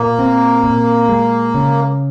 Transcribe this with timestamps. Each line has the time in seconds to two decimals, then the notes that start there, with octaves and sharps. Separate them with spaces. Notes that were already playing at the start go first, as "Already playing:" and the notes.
Already playing: A#2 A#3
0.19 C4
0.64 A#2
1.09 G#3
1.54 C#3